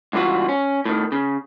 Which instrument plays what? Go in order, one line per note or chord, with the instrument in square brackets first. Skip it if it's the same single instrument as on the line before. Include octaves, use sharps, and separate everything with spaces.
[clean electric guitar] C#2 G2 E3 F4 F#4
C#4
A2 D#3
C#3